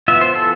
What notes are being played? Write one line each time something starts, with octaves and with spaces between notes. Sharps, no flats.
E3 B3 F4 E5
C5
A4